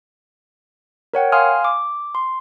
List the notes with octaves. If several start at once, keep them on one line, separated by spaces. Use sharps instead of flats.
A#4 C#5 F#5 G5
F5 G#5 C6 D#6 F6
D6
C6